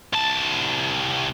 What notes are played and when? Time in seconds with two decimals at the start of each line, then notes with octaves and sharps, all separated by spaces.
0.13 C2 A5